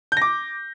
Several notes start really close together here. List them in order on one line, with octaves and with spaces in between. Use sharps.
G6 A#6 D6